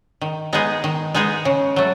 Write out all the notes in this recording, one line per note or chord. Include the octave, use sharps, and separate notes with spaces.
D#3
G#3 B3 D#4 G#4
D#3
G#3 B3 D#4 G#4
C#3
F#3 A3